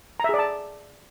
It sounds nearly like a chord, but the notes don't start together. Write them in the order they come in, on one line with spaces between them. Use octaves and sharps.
A#5 E5 G#4 D5 A5